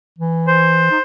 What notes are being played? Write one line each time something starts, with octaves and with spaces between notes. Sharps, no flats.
E3
C5
D#4